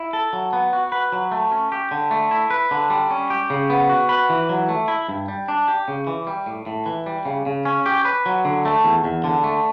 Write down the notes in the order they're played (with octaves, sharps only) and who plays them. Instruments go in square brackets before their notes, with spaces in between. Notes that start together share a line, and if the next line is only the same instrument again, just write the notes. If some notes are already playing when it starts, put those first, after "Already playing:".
Already playing: [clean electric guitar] E4
A4
F#3
B3
F#4
B4
F#3
A3
C#4
G4
D3
A3
E4
B4
D3
G3
C#4
G4
C#3
B3
F#4
B4
E3
F#3
A3
E4
G2
G3
D4
G4
C#3
E3
G3
A2
A2
E3
G3
C#3
C#3
C#4
G4
B4
F#3
D3
A3
E2
E2
D3
A3